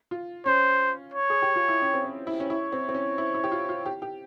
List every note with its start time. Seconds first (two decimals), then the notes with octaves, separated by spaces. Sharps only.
0.11 F4
0.46 C#4 C5
1.14 C#5
1.30 G#4
1.42 G4
1.56 F4
1.68 E4
1.82 C#4
1.94 C4
2.05 C#4
2.27 E4
2.40 C#4
2.50 E4 C#5
2.72 C4
2.89 C4
2.94 C#4
3.18 E4
3.34 E4
3.44 G4
3.52 F4
3.69 F4
3.86 G4
4.02 G4